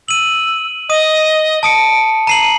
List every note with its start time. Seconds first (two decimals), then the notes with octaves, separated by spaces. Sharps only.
0.08 E6 D#7 F#7
0.90 D#5 D#6 D#7
1.63 A5 D#6 C#7 D7
2.27 A#5 C7 D#7 F#7